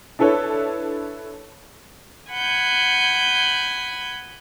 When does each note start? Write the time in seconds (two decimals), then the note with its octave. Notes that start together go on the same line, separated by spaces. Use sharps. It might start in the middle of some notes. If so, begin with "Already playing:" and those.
0.19 D4 E4 A4 B4 C#5
2.31 F#5 G#5 B5 G6